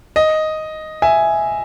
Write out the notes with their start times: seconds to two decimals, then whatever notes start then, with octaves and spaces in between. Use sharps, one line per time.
0.16 D#5
1.02 E5 G#5